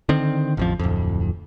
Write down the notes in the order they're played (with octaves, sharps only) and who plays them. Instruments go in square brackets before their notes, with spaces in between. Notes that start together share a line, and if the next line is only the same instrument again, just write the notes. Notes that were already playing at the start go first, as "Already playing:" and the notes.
[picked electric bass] D3 D#3 C4
A1 F2 F3
D1 F2